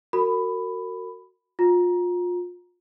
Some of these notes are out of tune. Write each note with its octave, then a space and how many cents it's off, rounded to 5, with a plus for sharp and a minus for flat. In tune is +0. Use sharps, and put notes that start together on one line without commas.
F#4 +0 A#4 -35 B5 +10
F4 +30 A#5 +20